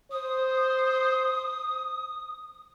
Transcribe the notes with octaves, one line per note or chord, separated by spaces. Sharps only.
C5 D#6